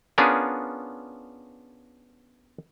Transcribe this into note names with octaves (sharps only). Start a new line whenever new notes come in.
B3 C#4 D4 F4 G#4 A#4